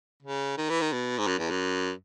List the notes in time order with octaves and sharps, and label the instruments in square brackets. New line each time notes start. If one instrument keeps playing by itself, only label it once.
[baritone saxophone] C#3
D#3
E3
D#3
B2
G#2
F#2
E2
F#2